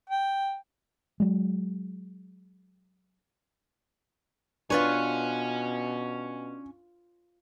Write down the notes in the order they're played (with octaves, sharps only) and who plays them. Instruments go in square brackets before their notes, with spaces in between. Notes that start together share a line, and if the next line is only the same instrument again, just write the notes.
[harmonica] G5
[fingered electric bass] F#3 G#3
[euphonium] B2 [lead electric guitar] C#4 G#5 [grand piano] D4 [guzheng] F4 B4 C#5